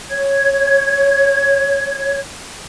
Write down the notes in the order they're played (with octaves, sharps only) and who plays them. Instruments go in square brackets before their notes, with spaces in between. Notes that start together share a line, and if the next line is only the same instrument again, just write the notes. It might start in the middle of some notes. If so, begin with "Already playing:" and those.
[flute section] C#5 G#6